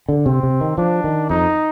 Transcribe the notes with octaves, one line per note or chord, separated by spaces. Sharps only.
D3
C3 C4
C3
D#3
F3 D4
D#3
F2 D#4